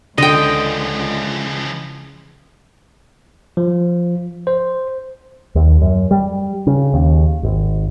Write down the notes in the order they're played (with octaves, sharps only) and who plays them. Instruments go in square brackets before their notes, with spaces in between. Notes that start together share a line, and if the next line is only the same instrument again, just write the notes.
[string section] C#2 [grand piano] D3 [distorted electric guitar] E3 F3 [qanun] D#5 G5
[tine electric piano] F3
C5
[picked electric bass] D#2
F#2
G3
C#3
D#2
G#1